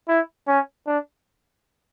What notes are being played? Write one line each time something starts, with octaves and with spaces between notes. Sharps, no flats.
E4
C#4
D4